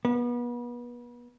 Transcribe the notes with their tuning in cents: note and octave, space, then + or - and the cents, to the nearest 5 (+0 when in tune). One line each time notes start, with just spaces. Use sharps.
B3 -35